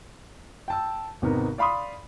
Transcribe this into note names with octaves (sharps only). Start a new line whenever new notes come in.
G5 A5 E6
G#1 C3 B3 D#4 A#4
D5 F5 B5 C6 D#6